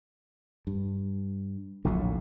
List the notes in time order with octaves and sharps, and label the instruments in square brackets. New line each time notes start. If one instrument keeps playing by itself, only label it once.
[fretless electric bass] G2
[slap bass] A#1 D#2 A2 [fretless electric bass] D3 F#3